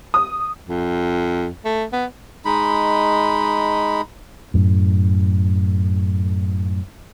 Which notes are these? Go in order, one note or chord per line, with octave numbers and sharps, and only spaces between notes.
D#6
F2
A3
B3
G#3 D#4 B5
F#2 A2